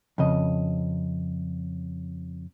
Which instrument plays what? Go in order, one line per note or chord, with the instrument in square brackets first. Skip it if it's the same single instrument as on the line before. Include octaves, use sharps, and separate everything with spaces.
[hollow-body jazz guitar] F2 C#3 D#5